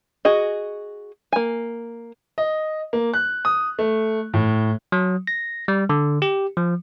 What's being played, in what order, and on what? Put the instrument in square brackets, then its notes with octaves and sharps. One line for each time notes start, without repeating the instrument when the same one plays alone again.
[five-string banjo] F#4 G#4 D#5
A#3 G#5
[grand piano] D#5
A#3
F#6
D#6
A3
A2
[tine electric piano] F#3
A#6
G3
D3
G4
F3